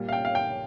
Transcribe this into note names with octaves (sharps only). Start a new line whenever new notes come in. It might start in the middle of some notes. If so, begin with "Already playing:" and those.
Already playing: A#2 G3
F5
G5
F5
G5